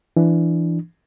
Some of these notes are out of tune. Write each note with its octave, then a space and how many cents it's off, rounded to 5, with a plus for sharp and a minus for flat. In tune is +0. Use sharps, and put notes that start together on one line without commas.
E3 +20 D4 +10